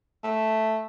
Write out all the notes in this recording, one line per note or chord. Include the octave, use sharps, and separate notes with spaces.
A3